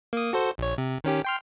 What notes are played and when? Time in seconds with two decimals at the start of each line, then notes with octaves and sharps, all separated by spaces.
0.13 A#3 D#6
0.33 F#4 A4 C5
0.58 A#1 C#5
0.78 C3
1.04 D#3 C#4 G4
1.24 G5 C6 F6